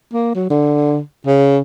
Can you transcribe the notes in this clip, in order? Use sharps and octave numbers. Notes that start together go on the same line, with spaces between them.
A#3
F#3
D3
C#3